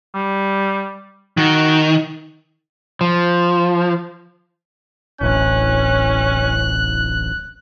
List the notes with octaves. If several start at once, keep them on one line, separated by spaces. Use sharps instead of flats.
G3
D#3 F#4
F3
D1 A1 C#4 F#6